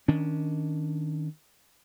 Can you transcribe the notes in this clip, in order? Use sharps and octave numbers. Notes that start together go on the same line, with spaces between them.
D#3 C#4 D4